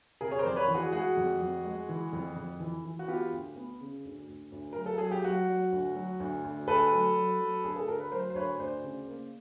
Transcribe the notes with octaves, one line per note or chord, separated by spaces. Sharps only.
C3 G#4 A#4
C#5
A#4 C5
F2 D5
B4 C#5
E3
F#4 G#4
G#3 F#4 G#4
F2
F2
G#3
E3
F2
F2
E3
E3
F#4
B3 F4 G4
D2
B3
C#3
D2
D2
D2
F#3 A#4
A4
F#3 G#4
G4
F#3 F#4
F#3
D2
F#3
D2
D2
D2 A4 B4
F#3
F#3
F#3
D2 G#4
A4
D2 A#4
B4
F#3 A#4 C5
C5
D2 B4 C#5
D2 C5 D5
C#3
A#3